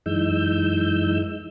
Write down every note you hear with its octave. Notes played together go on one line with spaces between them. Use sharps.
F#2 E3 G#3 D#4 E6 G6